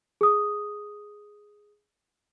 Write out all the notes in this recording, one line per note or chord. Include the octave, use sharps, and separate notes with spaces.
G#4 D#6